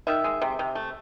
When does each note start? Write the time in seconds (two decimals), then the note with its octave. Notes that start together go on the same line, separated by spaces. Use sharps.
0.07 D#3 E5
0.24 G#3
0.42 C3
0.59 C3
0.75 A3